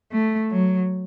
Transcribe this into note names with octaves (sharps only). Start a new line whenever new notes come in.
A3
F#3